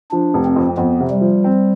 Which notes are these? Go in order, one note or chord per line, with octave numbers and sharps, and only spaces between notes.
F3 D4
F1
C4
F2
F2 B3
C3
G3
F3
C4